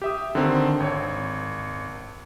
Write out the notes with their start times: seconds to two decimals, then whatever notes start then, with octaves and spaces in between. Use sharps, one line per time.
0.02 G4 E5 D#6
0.35 D3 D#3 C4
0.80 G#1 C#5